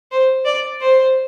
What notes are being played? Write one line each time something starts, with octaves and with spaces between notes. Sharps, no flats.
C5
D5
C5